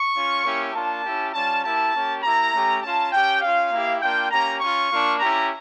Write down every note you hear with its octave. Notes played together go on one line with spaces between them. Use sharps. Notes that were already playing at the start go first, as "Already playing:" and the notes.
Already playing: C#6
C#4 F4
A#3 C#4 E4 G4
A#3 D4 F4 A5
C#4 E4 G4
G3 C#4 F4 A5
A#3 E4 G4 A5
A#3 C#4 G4
A#3 E4 G4 A#5
A3 C#4 G4
C#4 F4 A5
C#4 G4 G5
C#4 F4 F5
A#3 E4 G4
A#3 D4 F4 G5
A#3 C#4 G4 A#5
C#4 F4 C#6
A#3 D4 F4
C#4 E4 G4 A#5